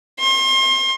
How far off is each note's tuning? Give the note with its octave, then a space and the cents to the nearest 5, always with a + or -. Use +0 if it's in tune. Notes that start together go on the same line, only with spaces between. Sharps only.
C6 +35